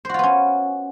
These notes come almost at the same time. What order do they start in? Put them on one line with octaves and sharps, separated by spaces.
C5 F#4 F4 B3 C#4